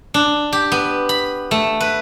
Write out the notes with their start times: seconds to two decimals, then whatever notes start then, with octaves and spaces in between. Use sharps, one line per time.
0.14 D4
0.53 G4
0.72 B3
1.09 B5
1.51 A3
1.80 B4